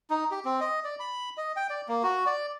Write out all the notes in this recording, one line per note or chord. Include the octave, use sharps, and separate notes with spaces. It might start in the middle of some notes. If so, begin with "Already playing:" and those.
D#4
G4
C4
D#5
D5
B5
D#5
G5
D5
A#3
F#4
D5